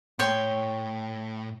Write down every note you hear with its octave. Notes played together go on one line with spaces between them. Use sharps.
A2 C#5 G5 C6